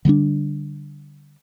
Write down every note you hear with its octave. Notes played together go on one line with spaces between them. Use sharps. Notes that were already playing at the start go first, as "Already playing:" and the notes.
D3 G3 B3 D4